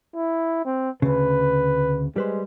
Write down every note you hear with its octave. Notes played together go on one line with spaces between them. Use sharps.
E4
C4
D2 C#3 B4
G3 G#3 B4 C5